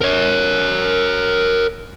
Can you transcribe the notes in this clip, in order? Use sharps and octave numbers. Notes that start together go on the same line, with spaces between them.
A#4 C#5